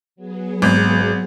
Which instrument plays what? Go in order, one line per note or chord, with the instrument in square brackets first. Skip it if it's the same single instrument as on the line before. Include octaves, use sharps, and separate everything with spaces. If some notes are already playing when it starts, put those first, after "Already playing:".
[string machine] F#3 B3 G#4
[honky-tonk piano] G#1